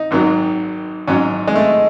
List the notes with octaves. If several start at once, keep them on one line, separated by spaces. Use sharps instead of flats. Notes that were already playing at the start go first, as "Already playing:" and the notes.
Already playing: D#4
G#1 G#2 D#3 F#3
A1 G#2 F#3 C#4
G#3
A3